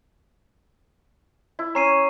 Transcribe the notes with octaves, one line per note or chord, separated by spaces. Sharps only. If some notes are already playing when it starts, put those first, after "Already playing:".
E4
C#4 A#5 C7 D#7